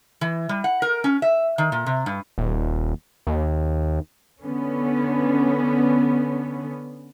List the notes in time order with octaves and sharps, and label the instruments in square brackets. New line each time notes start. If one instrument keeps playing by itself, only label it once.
[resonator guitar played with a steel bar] E3
G3
F#5
A#4
C#4
E5
D#3
A#2
C3
G2
[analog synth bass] D#1
D#2
[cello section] D3 B3 C#4